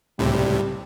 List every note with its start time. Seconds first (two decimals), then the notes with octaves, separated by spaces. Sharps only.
0.19 C#2 A2 C3 G3